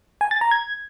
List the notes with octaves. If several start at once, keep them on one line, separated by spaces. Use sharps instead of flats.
G#5
A6
A#5
G#6